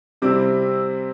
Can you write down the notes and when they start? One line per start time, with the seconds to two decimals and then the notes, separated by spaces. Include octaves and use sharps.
0.22 C3 G3 C4 E4 D6